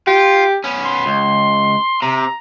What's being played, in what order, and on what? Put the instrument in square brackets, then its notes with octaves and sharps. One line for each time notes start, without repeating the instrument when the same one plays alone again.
[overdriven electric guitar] F4 [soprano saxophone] G4
[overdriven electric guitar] B3 C#4
[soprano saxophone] C6
[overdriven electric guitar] C#2
[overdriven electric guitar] C3 [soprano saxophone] A#5